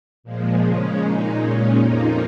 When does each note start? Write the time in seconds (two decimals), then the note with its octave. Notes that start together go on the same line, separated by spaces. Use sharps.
0.24 A#2 F3 G#3
0.61 C#3 G#3 C#4
0.99 A#2 G#3 D#4
1.37 A#2 G#3 C#4
1.75 F2 F3 A#3 D#4